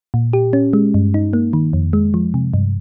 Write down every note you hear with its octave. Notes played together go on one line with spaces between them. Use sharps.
A#2
G4
C#4
G#3
G2
D#4
A#3
D#3
F2
G#3
F3
C3
G2